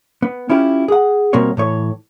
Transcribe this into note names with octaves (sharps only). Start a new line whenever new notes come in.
B3
C#4 E4 F4 G4
G#4 F#5
B2 G3 A#3 C4 C#5
A2 E3 C#5